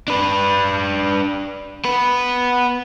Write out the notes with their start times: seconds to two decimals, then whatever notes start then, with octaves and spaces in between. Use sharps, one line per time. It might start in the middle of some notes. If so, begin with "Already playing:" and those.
0.08 D4 B4
1.85 B3 B4